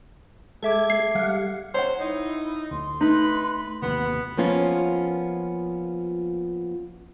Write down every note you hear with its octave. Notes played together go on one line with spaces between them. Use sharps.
G#3 A4 E5 D6 G#6
C7
G3 F5 F#5
C5 C#5 F#5
D#4 E4
D2 C6
A3 D#4 B4
A1 D#2 C3 B3
F3 A#3 B3 C#4 F4